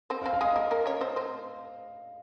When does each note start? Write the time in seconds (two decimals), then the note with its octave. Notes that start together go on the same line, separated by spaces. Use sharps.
0.10 C4 C5
0.22 F5
0.26 C4 C5
0.33 F5
0.41 G#3 G#4
0.45 D#5
0.56 A#3 A#4
0.71 A#3 A#4
0.86 C#4 C#5
1.01 C4 C5
1.16 C4 C5